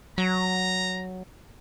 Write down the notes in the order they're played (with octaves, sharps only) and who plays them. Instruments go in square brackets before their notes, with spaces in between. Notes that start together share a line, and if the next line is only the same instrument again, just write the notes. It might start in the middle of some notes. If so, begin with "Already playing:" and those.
[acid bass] F#3 [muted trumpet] A#5